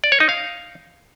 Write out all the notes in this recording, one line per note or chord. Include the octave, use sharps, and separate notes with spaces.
D5
C#5
D#4
F5